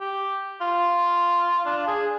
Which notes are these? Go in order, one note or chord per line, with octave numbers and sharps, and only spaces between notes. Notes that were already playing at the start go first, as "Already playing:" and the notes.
G4
F4
D4
G#4